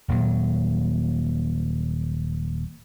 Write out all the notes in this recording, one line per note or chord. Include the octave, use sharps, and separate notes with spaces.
D#1 A#2 F#3